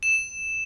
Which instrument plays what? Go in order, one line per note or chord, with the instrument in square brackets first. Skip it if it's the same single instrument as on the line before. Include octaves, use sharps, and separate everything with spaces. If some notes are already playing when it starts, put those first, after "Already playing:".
[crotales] E7